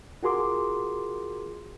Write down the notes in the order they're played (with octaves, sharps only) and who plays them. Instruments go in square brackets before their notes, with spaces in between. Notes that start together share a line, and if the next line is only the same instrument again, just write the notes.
[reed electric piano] F4 F#4 G#4 A#4 C6 D6